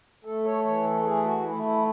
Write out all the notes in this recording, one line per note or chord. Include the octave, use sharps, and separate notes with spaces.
A3 A4
C#5
E3 C#5
A4
A3 G#4
F#4
A3 E4
E4